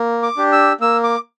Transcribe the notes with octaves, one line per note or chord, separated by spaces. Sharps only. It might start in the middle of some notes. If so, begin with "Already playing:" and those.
Already playing: A#3
D6
D4 G4
E6
A#3 E6
D6